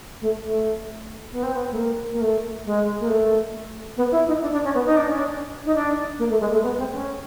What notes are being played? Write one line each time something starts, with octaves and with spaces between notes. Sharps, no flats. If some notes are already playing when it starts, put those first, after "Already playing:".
A3
A3
B3
C4
B3
A3
A#3
A#3
A3
G#3
A#3
A3
B3
E4
D#4
D4
D4
C#4
B3
D#4
D4
C#4
D4
D#4
D4
A#3
A3
G#3
A3
B3
C4
C#4